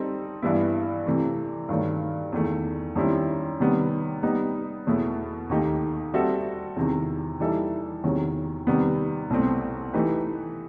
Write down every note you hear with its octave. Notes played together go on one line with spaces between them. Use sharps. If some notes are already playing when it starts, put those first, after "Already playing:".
Already playing: G3 C4 D#4 A4
G2 E3 G3 B3 E4
C3 E3 A3
G2 D#3 F#3 A3
E2 D#3 A3
F#2 D#3 G3 C4 E4
C3 D#3 G3 B3
G3 B3 D#4
E2 B2 F#3 A3 E4
D#2 D#3 A3 D#4 G4
G3 C4 F#4 A4 E5
E2 C3 D#3
E3 G3 D#4 A4 E5
E2 C3 D#3 F#3
C3 D#3 G3 B3
C2 B2 A3 C4
E3 A3 D#4 G4 B4